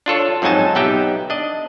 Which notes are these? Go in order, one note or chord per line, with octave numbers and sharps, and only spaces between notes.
D4 F4 A4 C#5
F2 G#2 F#3 D#4 G#5 A5
B1 B3 D#4 G4 E5 G5
D4 D#5